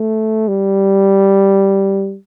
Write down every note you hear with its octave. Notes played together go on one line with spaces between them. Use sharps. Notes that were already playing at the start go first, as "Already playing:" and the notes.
Already playing: A3
G3